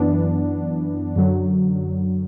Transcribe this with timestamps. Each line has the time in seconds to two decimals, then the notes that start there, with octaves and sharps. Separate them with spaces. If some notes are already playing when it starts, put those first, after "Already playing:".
Already playing: F#2 E3 B3 D4
1.16 F#2 D3 F#3